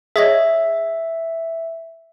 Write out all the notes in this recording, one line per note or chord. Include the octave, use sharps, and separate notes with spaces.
G#4 C#5 D#5 E5